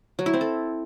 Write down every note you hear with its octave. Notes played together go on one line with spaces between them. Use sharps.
F#3
E4
C4
A4